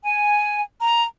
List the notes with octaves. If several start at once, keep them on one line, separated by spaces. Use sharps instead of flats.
G#5
A#5